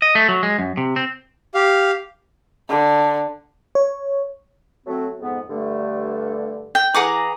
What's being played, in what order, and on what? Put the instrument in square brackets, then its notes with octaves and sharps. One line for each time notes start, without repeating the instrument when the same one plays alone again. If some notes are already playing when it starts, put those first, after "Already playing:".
[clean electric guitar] D#5
A3
F#3
G#3
F#2
C3
C4
[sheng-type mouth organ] G4 F5
[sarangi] D3
[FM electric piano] C#5
[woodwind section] F#3 A3 C4
F2 G#2 B3
G2 D3 A3
[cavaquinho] G5
[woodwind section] E3 A#5 [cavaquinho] G#4 F#5 D6